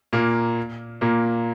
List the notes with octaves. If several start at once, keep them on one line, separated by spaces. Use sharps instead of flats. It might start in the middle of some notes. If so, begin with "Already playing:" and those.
A#2 A#3
A#2 A#3